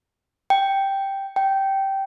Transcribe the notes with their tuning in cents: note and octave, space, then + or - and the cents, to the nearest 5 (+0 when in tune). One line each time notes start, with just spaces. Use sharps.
G5 +0
G5 -10